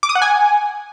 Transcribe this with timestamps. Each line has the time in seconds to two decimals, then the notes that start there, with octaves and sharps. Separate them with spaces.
0.03 D6
0.09 D#6
0.15 F#5
0.22 G#5